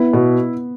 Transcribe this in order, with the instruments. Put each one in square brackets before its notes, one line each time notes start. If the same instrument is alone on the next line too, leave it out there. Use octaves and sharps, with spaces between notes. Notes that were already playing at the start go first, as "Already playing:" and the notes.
Already playing: [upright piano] B3 [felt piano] E4
[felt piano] B2